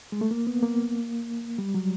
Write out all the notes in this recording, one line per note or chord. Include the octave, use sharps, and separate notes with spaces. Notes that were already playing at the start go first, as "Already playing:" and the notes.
G#3
A3
A#3
B3
A#3
G3
F#3